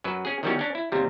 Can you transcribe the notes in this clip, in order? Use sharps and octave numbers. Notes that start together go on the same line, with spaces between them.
F#2 F#3 B4
C#4 G#4
D#3 E3 F#3 G3 B3 C#4
C#4 D4
E4
D#2 C3 G3